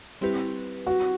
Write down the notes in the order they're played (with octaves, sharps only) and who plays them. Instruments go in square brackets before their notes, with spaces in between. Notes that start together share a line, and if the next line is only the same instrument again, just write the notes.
[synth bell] G3 C4 E4 G4 B4
[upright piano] F#4